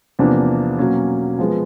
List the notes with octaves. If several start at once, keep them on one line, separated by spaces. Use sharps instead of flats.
E2 C3 F3 A#3 D4
B2 F#3 A#3 C#4
F3 G#3 B3